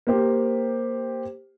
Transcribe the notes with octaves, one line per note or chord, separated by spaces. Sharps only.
A#3 G4 C5